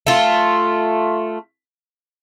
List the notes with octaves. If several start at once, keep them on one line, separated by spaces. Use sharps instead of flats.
A3 F4